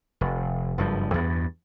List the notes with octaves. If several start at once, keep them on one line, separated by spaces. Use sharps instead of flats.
F1
F#1 G2 F3
E2 G2 B3